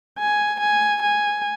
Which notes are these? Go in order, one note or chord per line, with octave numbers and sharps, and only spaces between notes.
G#5
G#5
G#5